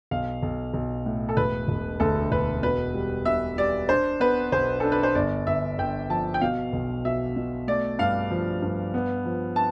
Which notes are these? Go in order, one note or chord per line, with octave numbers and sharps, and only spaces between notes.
B1 F5
B1
B1
A2
A4
E1 B4
E1
D2 A4
E1 B4
B2 B4
G3
B2 E5
G3 D5
D4 C5
B3 B4
B1 C5
D4 A4
B4
C5
G1 D5
G1 E5
G1 G5
F3 A5
G5
B2 F5
B1
B2 E5
B2
A3 D5
G2 F5
F3
G2
B3
F3
A5